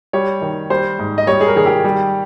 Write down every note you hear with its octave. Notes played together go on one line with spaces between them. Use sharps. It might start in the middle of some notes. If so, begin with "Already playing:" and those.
G3 C#5
D#3
G3 C5
G#2
D#5
G3 C#5
G#4
A#4
D#3 G#4
G4
G3